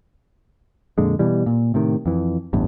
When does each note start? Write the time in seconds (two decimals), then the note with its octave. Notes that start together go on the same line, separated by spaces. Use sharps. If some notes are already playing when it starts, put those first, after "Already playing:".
0.98 F2 A#2 D3 G#3
1.19 B2 E3 G3
1.46 A#2
1.74 A2 C3 D#3
2.06 F2 E3
2.53 A1 E2 G2